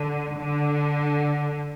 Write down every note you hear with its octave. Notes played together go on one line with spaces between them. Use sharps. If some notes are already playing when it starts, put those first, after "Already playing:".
Already playing: D3
D3